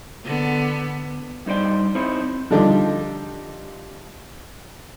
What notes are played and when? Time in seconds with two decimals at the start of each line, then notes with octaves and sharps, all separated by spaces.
0.25 D3 B3
1.46 G2 D#4 C5 D5 G5
1.95 C4 D#4 E4 C5 C#5
2.50 D3 F3 G3 D4 D#4 G4